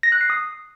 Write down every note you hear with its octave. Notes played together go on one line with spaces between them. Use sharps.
A#6
F#6
C7
D#6